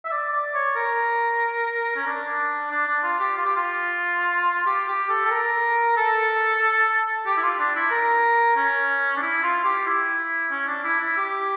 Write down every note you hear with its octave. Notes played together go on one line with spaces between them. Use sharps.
E5
D5
D5
C#5
A#4
C#4
D4
D4
D4
F4
G4
F4
G4
F4
G4
G4
A4
A4
A#4
A4
G4
E4
F4
D4
E4
A#4
C#4
D4
E4
F4
G4
E4
C#4
D4
E4
E4
G4